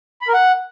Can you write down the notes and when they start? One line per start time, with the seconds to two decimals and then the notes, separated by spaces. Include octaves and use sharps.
0.21 B5
0.28 A#4
0.34 F#5